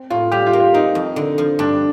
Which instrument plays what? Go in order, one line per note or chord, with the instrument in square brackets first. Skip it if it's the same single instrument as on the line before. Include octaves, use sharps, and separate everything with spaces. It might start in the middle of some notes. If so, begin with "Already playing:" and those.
Already playing: [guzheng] C4
[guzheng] A2 [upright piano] F4
[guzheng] G3 [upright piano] G4
[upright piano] F4
[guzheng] A#3
[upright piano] F4
[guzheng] C4 [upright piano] D#4
[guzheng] F2
D3
F3
[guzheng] G2 [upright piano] D4